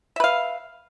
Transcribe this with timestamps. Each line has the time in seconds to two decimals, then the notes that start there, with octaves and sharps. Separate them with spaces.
0.16 E5
0.20 B4
0.24 F5